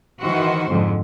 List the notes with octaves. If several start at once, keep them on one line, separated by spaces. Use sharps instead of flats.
D#3 E3 F#4 C5
F2 G#2 D3